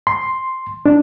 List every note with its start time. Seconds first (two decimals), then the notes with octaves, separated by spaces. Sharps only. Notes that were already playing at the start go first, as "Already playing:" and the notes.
0.07 C6
0.86 D4